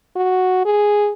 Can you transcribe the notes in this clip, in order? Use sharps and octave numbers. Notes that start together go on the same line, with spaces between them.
F#4
G#4